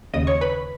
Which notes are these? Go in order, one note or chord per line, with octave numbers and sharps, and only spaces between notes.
D#2 C#3 D#5 D#6
C#5 C#6
B4 B5